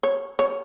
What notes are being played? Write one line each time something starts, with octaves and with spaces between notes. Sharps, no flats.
C#5
C#5